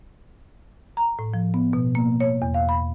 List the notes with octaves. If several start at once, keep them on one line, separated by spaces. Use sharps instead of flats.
A#5
A2
F3
B3
B2
A#3
C#5
E2
F5
B5